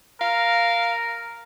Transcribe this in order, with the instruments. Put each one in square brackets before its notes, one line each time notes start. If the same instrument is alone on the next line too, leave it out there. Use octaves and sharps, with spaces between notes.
[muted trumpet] A#4 [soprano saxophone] F5